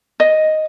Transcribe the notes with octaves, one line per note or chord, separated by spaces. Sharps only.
D#5